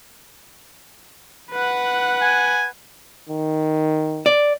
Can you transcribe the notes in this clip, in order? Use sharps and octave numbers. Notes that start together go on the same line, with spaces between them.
B4 F#5
G#5
D#3
D5